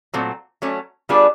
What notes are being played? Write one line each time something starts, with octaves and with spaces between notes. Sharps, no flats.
A#2 F#3 A3 C4
F#3 A3 C#4
G3 B3 D4 F4 G#4